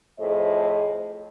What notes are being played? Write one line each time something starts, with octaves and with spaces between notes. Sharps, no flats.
F2 A2 A3 G#4 C5 D#5